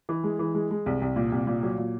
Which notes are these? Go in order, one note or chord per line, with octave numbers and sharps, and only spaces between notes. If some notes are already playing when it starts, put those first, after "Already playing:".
E3
G#3
E3
G#3
G#3
C2
C2
A#2
C2
A#2
F#3
A#2